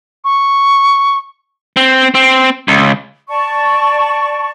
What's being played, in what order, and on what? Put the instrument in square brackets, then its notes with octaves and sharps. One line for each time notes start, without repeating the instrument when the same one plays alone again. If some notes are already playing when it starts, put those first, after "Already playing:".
[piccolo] C#6
[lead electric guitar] C4
C4
C#2
[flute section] D5 A5 C#6